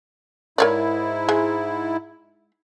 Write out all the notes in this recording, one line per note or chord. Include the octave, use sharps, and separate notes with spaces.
G#2 E4 A#4 C#5 D5
G#3